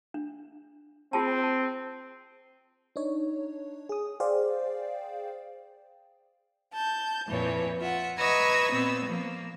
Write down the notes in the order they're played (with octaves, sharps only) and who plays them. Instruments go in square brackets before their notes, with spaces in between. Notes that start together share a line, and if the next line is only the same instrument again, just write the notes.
[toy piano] D4
[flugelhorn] C4 [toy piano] F4 G#4 A5
[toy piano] A5
[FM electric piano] D4 D#4 C#5
G#4 D#6
G#4 C5 D5 F5 G5
[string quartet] A5 G6
F2 A#2 E3 C#5
F4 E5 F#5
B4 D#5 A#5 C#6 E6 G#6
A#2 B3 C4 E6
F3 A#3